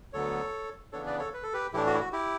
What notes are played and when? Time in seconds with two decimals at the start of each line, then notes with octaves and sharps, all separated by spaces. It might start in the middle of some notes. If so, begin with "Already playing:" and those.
0.13 D2 D3 F#3 B3 A4 C#5
0.93 C#3 E3 B3 D4 A4 C#5
1.06 B4 D5
1.19 A4 C#5
1.34 B4
1.43 A4
1.53 G4 B4
1.73 A2 E3 A3 D4 E4 G4
1.87 F#4
1.94 E4
2.00 F#4
2.12 E4 G4